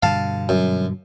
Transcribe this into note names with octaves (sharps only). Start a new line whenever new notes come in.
G2 B2 D3 F5 A5
F#2